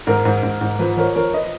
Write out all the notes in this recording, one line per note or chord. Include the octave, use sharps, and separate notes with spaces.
G#2 A#4
G#2
G#2
G#2
F3 B4
F3 A#4 C#5
F3 A#4 C#5
B4 D#5